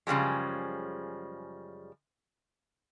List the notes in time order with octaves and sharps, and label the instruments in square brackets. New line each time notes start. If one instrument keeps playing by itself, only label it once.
[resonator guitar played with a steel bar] F#2 C#3 F3 G3 G#3